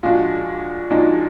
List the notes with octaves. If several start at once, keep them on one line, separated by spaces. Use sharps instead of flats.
A#1 A#2 G#3 D4 F4 F#4
A#1 A#2 G#3 D4 D#4 F#4